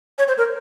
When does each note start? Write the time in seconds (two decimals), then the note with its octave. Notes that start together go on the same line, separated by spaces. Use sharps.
0.18 C#5
0.28 C5
0.38 A#4